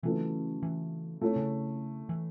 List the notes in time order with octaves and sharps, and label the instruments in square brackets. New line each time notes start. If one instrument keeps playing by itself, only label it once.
[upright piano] C#3 F#3 A3 E4 B4 [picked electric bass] E3
[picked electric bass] E3
[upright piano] A3 E4 C#5
[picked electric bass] C#3
E3